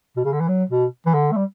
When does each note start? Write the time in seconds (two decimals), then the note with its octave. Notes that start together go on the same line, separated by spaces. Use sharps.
0.16 B2
0.25 C#3
0.32 D3
0.40 E3
0.48 F#3
0.69 B2
1.06 E3
1.14 D3
1.32 A3
1.36 G3